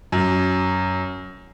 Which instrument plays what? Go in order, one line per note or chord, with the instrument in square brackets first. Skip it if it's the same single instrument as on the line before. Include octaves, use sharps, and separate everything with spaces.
[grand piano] F#2